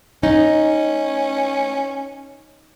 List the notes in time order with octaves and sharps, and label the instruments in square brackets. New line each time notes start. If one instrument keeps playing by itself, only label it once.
[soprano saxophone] C#4 [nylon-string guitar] D#4